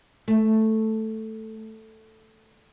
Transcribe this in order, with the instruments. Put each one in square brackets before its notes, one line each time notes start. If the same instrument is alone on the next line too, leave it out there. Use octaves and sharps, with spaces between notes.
[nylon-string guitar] A3